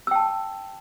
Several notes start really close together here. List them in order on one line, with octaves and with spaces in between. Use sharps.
E6 G5 A5